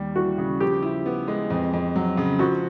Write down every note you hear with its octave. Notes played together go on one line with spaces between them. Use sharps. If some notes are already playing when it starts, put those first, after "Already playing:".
Already playing: D#2 G3
E3 F#4
C#3
F3 G4
E4
B3
G#3
F2
F2
F#3
C#3
F3 F#4